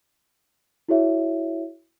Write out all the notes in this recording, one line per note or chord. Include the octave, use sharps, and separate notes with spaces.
E4 F#4 G#4 C#5 E5